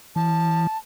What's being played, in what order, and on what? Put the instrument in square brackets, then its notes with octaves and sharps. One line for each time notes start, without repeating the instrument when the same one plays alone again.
[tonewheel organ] E3 [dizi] A5